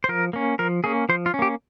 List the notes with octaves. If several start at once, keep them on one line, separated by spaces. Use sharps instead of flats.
C5
F3 A#4
A#3 C#4
F3 A#4
A#3 C#4 G#4
F3 C5
F4
C#4
A#3 G4